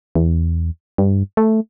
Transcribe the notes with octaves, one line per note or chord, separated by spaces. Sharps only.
E2
G2
A3